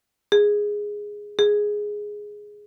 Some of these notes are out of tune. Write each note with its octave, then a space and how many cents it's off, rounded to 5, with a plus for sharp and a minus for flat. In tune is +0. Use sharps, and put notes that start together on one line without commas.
G#4 -5
G#4 +0